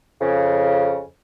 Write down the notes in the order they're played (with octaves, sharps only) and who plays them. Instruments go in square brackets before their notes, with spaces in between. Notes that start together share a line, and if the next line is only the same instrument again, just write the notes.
[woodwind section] F2 C#3